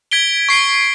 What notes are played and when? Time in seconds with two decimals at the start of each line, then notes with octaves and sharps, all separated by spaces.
0.12 G#6 B6 D7 G7
0.49 C#6 C7 D7 G7